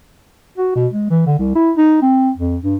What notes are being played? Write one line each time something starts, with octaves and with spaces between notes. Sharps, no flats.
F#4
B2
G#3
E3
D3
C2
E4
D#4
C4
F2
G2